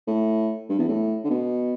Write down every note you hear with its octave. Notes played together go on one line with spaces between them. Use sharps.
A2
G2
E2
A2
D3
B2